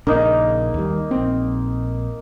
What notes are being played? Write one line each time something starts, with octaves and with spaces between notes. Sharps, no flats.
A#1 C#3 A#3 D4 D#4
D#2 G3
A#1 C4